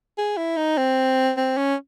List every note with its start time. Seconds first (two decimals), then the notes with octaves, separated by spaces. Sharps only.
0.18 G#4
0.37 E4
0.57 D#4
0.78 C4
1.37 C4
1.57 C#4